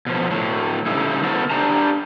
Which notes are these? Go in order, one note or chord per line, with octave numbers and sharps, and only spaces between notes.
B2 F3
A2 F#3
C#3 G3 A3 D#4 E4
B3 E4 F#4 A4 A#4 C5
D4 G4 A5 A#5